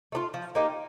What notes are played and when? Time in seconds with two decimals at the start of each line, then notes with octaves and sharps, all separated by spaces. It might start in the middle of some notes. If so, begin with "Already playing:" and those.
0.12 A3 D4 F4
0.34 F3
0.55 A#3 D#4 G4